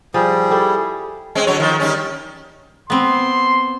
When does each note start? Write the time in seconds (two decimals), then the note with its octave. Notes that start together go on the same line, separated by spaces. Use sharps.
0.14 F3 G3 G#4
0.50 E4 G4 A4
1.35 G#3 C4 C#4
1.47 D3 F#3 C#5
1.60 D#3 F3
1.80 D#3 G3 C#4
2.90 B3 C4 C6